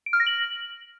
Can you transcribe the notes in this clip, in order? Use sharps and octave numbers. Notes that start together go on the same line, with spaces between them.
D7
F6
A#6
F#7